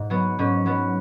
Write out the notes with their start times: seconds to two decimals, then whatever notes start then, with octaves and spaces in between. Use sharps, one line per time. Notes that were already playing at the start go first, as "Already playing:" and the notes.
Already playing: G#2
0.10 F#3 B3
0.39 G#2 C#4
0.66 F#3 B3